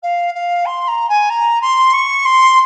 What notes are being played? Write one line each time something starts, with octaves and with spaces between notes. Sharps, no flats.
F5
F5
C6
A#5
G#5
A#5
C6
C#6
C6